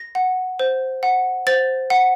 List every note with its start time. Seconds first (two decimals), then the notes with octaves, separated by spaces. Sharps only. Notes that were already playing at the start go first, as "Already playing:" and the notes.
Already playing: A#6
0.15 F#5
0.59 C5
1.03 F#5
1.47 C5 A6
1.90 F#5